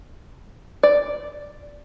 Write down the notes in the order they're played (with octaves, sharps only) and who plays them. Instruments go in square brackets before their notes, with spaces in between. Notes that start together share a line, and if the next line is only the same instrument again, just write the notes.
[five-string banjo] D5